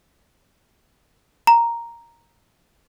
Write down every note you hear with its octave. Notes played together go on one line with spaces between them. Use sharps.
A#5